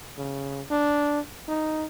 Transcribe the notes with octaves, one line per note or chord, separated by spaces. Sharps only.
C#3
D4
D#4